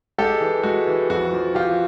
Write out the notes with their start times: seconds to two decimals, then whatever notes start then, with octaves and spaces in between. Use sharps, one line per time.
0.18 G#3 G4 A4
0.40 E3
0.63 G#3 F#4
0.87 E3
1.10 F2 F#4
1.33 F3
1.55 F3 F4 G4